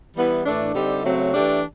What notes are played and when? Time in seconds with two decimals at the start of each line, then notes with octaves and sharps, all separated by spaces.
0.15 E3 G3 B3 E4
0.44 A2 E3 A3 D4
0.74 D3 G3 C4 D#4 G4
1.04 C#3 F#3 A3 C4
1.33 E3 A3 D4 G4